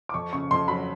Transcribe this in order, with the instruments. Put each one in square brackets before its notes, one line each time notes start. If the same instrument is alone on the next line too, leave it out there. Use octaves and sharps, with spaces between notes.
[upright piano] D6
[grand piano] F2 [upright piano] C#6
[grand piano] C#3 [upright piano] C#6
[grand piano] F2 [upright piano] C6
[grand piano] F#3 [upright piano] B5